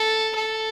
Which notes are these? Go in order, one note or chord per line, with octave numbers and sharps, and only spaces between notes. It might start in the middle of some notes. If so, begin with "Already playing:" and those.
Already playing: A4
A4